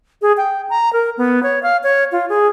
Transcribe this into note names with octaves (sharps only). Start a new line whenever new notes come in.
G#4
G5
A#5
A#4
B3
C#5
F5
C#5
F4
G#4